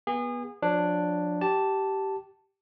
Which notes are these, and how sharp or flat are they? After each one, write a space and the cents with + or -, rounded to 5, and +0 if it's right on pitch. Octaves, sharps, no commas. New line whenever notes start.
B3 -25 G#4 -30
F3 +30 D4 +5 C#5 +0
G4 -15 A5 +0